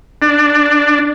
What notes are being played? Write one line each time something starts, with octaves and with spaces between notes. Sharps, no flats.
D4